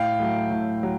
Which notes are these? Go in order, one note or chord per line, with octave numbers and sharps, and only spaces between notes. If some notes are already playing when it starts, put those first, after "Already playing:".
Already playing: A2 F5 G5
F#3 A3
A2
F#3